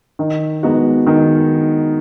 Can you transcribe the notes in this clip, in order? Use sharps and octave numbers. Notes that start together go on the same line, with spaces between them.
D#3
G#3 B3 D#4 F#4
D#3